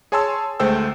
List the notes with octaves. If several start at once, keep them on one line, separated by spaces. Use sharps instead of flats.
G#4 C#5 G#5 A5 C6 E6
D2 G#3 A3 C5 G5 E6